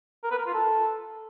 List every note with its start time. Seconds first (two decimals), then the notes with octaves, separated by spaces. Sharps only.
0.23 A#4
0.31 B4
0.39 A#4
0.46 F4
0.54 A4